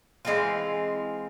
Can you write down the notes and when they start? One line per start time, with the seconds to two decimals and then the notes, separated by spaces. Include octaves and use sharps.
0.25 E3 G#3 C4 F4